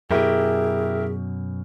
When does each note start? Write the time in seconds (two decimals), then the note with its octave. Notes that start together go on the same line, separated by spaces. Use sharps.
0.11 F#2 B2 E4 G4 G#4 A#4